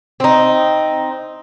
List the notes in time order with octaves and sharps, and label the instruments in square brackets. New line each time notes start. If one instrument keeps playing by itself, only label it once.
[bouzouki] C4 D#4